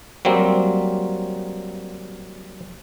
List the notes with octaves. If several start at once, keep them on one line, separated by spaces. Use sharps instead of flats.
F#3 G3 A#3 C4